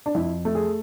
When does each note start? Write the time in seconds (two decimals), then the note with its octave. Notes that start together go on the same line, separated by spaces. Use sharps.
0.06 D4
0.15 F2 E4
0.45 A3
0.55 G#4